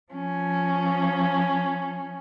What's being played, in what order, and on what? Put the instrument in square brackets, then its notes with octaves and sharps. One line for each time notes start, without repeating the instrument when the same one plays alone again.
[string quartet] F3 C#4